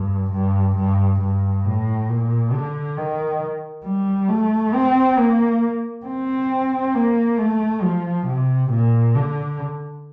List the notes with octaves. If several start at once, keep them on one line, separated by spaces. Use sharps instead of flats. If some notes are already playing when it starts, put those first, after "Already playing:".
Already playing: G2
G2
G2
G2
A2
A#2
D3
D#3
G3
A3
C4
A#3
C4
A#3
A3
F3
C3
A#2
D3